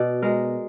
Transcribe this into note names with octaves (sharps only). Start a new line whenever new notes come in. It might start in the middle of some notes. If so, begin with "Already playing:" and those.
Already playing: B2 D5
G#3 A#4